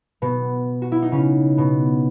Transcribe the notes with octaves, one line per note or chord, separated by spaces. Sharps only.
B2 B3
F#4
E4
D#4
C#3 C#4
B2 B3